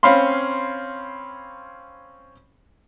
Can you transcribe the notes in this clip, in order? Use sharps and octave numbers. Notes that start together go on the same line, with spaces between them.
C4 C#4 C#5 F5 B5 C6